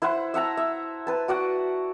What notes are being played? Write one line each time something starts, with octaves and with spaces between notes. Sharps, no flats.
E4 C5 F#5
E5 F#5 A5 A#5
E5
B4 A5
F#4 D5 F#5